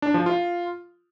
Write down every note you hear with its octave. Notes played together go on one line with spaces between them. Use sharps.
D4
F3
F4